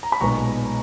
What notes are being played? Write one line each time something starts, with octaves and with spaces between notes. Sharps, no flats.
A#5
B5
B1 A#2 G#3 B3 A#5 C#6